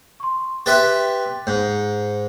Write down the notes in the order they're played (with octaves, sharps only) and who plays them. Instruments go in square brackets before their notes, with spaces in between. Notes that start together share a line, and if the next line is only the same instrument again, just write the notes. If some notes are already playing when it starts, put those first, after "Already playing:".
[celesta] C6 C#6
[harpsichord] G4 B4 E5 [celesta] G5 C6 A6
[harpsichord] G#2 [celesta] G6